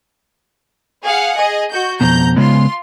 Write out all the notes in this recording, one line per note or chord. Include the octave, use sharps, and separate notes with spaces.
G#4 F5 F#5
G#4 D#5
F#4 G6
F2 B2 A#5 G6
C#3 G#3 B3 F4 C6